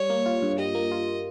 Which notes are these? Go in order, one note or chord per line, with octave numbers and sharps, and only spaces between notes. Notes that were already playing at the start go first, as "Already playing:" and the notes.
Already playing: G3 C#5
A#3
F4
G2
G3 D#5
A#3
F4